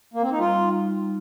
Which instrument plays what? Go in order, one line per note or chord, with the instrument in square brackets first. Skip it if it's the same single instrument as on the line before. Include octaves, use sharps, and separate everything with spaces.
[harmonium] A#3
C4
D#4
[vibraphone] G3 [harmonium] F4
[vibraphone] D#4
G3